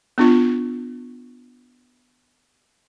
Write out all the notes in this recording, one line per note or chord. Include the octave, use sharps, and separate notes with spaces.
B3 D4 F4